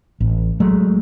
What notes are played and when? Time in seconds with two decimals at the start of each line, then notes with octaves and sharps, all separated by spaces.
0.21 A1
0.60 F#3 G#3 A3